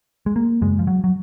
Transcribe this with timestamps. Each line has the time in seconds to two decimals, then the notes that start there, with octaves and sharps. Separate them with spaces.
0.26 G#3
0.36 A#3
0.61 F#2 C#3 G#3
0.79 F3
0.87 F#3
1.04 F#3